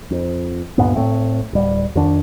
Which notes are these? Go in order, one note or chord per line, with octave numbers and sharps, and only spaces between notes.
F2
D2 G2 A#2 B3
A2 A3 C4
D1 G3
F2 D#3 D4